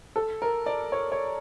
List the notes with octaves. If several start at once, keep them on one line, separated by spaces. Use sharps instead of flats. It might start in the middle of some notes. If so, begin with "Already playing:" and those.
A4
A#4
D5
C#5
C#5